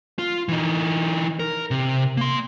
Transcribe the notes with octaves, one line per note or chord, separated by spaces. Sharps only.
F4
E3 D#4
A#4
C3
A#3 C6